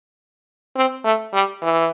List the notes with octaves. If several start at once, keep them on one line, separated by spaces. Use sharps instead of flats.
C4
A3
G3
E3